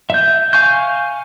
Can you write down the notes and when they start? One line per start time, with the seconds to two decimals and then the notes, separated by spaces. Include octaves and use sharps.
0.10 E5 G6
0.53 F5 G#5 C#6 G6